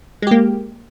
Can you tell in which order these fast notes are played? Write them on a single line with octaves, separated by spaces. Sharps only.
G#3 G4 A#3